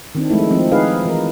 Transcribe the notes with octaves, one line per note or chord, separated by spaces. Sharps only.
D#3 C4 D4
F3 G#3 A3 E4
F3 C4
D#4 G#4 B4 F5
E3 A#4